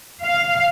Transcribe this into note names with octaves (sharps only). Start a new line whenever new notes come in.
F5